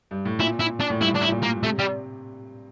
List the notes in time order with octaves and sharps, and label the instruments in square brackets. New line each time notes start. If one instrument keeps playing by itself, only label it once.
[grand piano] G2
A2
[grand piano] A#2 [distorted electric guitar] E4
[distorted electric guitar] E4
D4
[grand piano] A2
[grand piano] G2 [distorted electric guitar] E4
[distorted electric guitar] D4
E4
[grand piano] A#2
[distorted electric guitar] A#3
[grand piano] C3 [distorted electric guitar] A3
[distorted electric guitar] G3